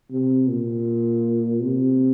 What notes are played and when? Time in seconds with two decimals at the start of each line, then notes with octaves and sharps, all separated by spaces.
0.10 C3
0.49 A#2
1.62 C3